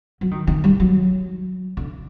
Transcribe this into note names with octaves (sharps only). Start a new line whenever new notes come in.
F#3
D#3
D#3
G3
F#3
D3